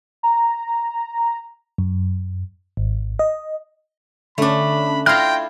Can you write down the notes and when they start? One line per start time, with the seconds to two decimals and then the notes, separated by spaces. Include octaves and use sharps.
0.23 A#5
1.78 F#2
2.77 G#1
3.19 D#5
4.38 D3 A3 C#4 D4 B5
5.06 E4 F4 G5 C6 F6 A#6